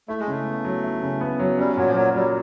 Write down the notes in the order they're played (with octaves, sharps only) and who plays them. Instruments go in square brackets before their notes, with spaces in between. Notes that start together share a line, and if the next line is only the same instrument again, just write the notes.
[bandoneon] A3 [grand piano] E4
[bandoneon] G#3
[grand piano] C#3 [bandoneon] A3
[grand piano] B3
F#3
E4
C#3
B3
F#3
[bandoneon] G3 [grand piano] C#4
[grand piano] A#2 [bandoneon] F#3
[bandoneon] F3
[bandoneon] F#3 [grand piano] A#3
[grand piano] F#3 [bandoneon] G3